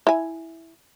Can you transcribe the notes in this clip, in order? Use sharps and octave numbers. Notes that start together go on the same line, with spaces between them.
E4 G#5